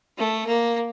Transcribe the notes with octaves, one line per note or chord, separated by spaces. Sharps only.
A3
A#3